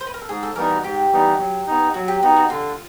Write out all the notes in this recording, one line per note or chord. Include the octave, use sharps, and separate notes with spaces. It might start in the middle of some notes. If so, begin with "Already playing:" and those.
C5
B4
A#4
A4
G#2 G#4
A4
E3 G3 B3 D#4 A#4
F#4
G#2 G4
E3 G3 B3 D#4
F#3
B3 D#4
F#3 F#4
G4
B3 D#4 F#4
F#4
D3 F4